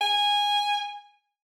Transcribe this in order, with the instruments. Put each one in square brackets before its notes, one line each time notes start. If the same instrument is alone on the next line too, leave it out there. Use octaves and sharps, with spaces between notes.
[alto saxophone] G#5